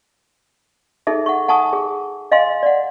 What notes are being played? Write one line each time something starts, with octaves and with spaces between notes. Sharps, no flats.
D#4 G#4 A4 E5
F#5 C#6
F#5 G#5 A5 C#6 D#6
G#4
D#5 F5 G#5 C6
D5 F#5